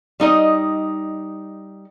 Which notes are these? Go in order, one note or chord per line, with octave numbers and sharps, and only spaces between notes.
G3 D#4 D#5